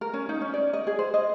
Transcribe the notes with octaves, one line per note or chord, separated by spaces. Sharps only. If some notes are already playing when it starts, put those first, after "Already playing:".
A#4
C#4
D#4
C#4
D5
D#5
G#4
C5
D#5